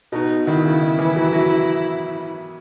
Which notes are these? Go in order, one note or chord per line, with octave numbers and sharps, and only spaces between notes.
B2 D#4
D#3 E4
C#3
D#3
E3
F#3
F#3